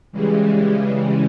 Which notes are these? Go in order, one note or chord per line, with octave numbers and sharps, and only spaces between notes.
C#3 E3 G3 G#3